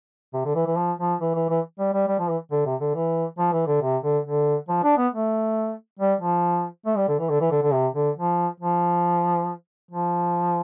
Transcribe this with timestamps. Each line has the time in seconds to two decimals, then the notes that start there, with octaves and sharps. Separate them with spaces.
0.34 C3
0.45 D3
0.55 E3
0.66 E3
0.77 F3
0.99 F3
1.21 E3
1.35 E3
1.49 E3
1.79 G3
1.93 G3
2.07 G3
2.19 F3
2.29 E3
2.51 D3
2.65 C3
2.80 D3
2.95 E3
3.38 F3
3.52 E3
3.67 D3
3.82 C3
4.03 D3
4.25 D3
4.68 F3
4.83 D4
4.97 B3
5.13 A3
5.99 G3
6.21 F3
6.86 A3
6.97 G3
7.08 D3
7.19 E3
7.30 D3
7.40 E3
7.51 D3
7.62 D3
7.73 C3
7.95 D3
8.17 F3
8.60 F3
9.91 F3